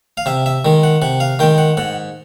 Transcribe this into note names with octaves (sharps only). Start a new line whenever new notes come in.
F5
C3 E5
E5
D#3 G#3
F#5
C3 F#5
F5
D#3 G#3 G5
F#5
G#2 F#5